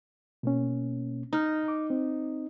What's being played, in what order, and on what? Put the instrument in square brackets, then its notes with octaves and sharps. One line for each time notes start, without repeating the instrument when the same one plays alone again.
[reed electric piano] B2 A#3 C#4
[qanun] D#4 [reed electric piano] A#5 F6
[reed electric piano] D6
C4